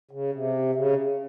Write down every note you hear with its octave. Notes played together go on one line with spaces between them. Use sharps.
C#3
C3
C#3